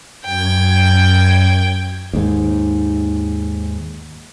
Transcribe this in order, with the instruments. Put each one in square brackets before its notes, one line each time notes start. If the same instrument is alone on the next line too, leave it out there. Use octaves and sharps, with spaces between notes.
[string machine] F#2 G#6 [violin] G5
[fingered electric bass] D#2 G#2